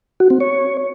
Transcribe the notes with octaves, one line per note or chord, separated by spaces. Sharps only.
F#4
C4
C#5